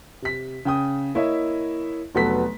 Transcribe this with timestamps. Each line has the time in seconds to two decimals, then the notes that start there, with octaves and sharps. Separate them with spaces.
0.22 C3 B6
0.65 C#3 G5 D#6
1.15 A#3 E4 C#5 D#5 E5
2.15 F1 F#3 B3 A4 B6